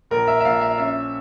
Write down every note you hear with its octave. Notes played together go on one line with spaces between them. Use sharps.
A#1 A#4
E5
E5
A#1 F5
E5
C#4 E5